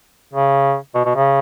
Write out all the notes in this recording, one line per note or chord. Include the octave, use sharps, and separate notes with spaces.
C#3
B2
B2
C#3